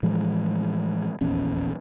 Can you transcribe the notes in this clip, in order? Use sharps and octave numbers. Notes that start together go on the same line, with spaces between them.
A2 E3 F3 G#3
D#1 A#1 E2 C#4